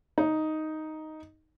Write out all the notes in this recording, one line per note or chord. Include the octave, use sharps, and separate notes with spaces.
D#4